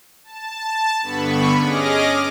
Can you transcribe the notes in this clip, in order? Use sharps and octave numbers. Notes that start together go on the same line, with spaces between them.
A5
G2 D3 B3 B5 C#6
C#4 G#4 D#5 D6 F6 A#6